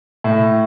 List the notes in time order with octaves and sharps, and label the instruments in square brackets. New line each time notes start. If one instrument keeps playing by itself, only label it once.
[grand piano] A2